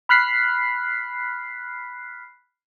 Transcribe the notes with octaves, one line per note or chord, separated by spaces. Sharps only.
B5 F6 F#6 B6 C7